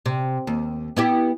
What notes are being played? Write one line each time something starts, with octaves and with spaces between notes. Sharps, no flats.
C3
D#2
B3 E4 G4